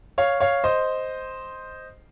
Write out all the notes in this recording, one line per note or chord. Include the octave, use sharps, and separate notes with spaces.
C#5 F5
C#5 F5
C5 D#5